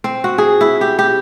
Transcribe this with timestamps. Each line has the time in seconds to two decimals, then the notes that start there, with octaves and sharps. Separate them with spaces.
0.04 C4
0.24 F#4
0.38 G#4
0.61 E4
0.81 G4
0.99 G4